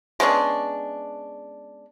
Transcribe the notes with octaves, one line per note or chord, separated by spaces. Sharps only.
G#3 B3 C#4 D4